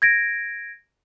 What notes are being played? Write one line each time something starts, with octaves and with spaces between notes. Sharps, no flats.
G#6 A#6 D7